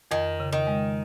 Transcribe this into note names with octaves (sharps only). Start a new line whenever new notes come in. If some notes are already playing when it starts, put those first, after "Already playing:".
F2 D#3
C#3
D#3
G#3